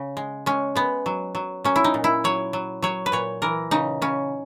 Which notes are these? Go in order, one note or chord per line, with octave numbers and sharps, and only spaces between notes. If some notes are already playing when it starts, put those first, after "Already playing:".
Already playing: C#3
G#3
G#3 C#4
G#3 B3
F#3
F#3
F#3 C#4
E4
D#4
A#2
E4
F#3 C#5
F#3
F#3 C#5
B4
A#2 C#5
E3 A#4
C#3 D#4
C#3 C#4